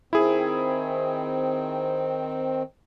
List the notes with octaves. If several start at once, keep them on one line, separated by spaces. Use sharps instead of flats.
D#3 C4 E4 G#4